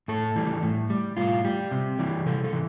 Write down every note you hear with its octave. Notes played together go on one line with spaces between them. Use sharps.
A2 A4
E3 G3
A2
G3
A2 F4
G3 G4
C3
E3 G3
C3 A4
A4
E3